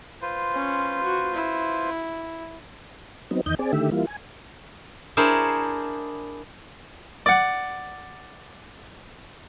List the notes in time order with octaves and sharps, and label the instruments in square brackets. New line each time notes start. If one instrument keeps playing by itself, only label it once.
[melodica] F4 B4 C5
[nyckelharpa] C#4
F#4
E4
[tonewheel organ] F#3 B3 C4 D#4
E2 D#3 D#5 G6
C4 G#4 D5
D3 D#3 A3 G4 E5
E3 G3 A#3 E4 F4
G#5
[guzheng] D4 E4 G#4 A#4 C5 C#5
[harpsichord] D5 F#5